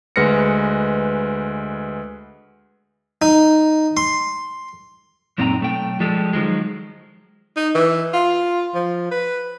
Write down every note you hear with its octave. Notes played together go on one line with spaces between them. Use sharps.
D2 G#3 B4 F6 A#6 C#7
D#4
C6
F#2 A#2 C4 D#4 G5 A#5
B1 A3 G5
F3 G3 G#3 G4 A4
D#3 F3 F#3 G#3
D#4
E3
F4
F3
B4